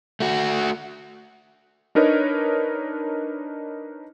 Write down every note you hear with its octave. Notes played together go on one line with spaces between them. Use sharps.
A3 F#4
D4 D#4 A#4 B4 C#5 D#5